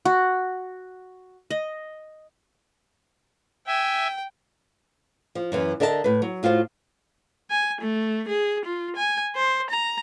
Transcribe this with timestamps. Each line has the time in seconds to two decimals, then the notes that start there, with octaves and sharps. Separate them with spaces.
0.05 F#4
1.50 D#5
3.67 E5 G5 G#5
5.35 F3
5.52 F#2 E3
5.80 D3 A#4 D#5 E5 A5
6.04 A2 B4
6.22 F#3
6.43 A2 F4 F#4 C5
7.51 G#5
7.81 A3
8.29 G#4
8.65 F4
8.96 G#5
9.36 C5
9.70 A#5